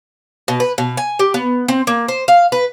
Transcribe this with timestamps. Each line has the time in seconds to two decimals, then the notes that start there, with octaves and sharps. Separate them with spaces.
0.48 B2
0.60 B4
0.78 B2
0.97 G#5
1.19 G4
1.34 B3
1.68 C4
1.87 A#3
2.08 C5
2.28 F5
2.52 B4